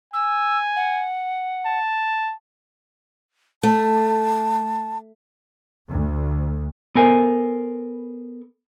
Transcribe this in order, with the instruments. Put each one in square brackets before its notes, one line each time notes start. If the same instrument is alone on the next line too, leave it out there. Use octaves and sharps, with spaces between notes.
[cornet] G#5 [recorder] E6
[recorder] F#5
[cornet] A5
[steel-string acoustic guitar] A3 [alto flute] A5
[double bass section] D2
[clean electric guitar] B3 A4 A#4 C5 G#5